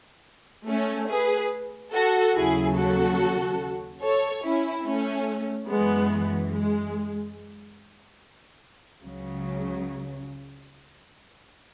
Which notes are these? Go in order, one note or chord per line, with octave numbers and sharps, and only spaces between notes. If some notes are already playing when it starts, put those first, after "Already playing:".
A3 C#4
G#4 B4
F#4 A4
D#2 C#3 F#3 E4 G#4
F#4 A4
A4 C#5
C#4 E4
A3 C#4
F#2 E3 G#3 B3
G#3
C#2 C#3 F#3